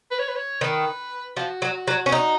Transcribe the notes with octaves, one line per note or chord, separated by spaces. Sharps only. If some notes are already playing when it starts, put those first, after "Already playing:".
B4
C#5
B4
C#5
D#3 B4
F3 F#4
F#3
F#3
C#4
D#4